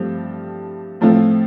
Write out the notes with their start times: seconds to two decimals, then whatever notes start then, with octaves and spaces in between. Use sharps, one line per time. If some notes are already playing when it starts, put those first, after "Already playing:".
Already playing: G2 F3 A3 C4 G4
1.01 A2 F3 A3 C4 F4